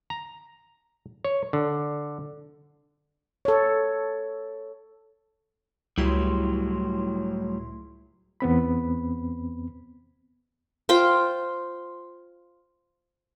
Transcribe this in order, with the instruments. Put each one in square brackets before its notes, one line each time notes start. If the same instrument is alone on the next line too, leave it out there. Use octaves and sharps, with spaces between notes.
[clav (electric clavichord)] A#5
C#5
D3
[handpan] A4 C#5
[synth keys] C#2 E4 C6 [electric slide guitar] A2 F#3 G3
[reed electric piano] E2 B3 C4 B5
[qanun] F4 C5 G5